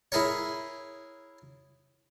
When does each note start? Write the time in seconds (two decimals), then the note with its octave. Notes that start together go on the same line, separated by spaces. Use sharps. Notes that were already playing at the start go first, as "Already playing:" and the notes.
0.12 E4 G#4 A#4 C#5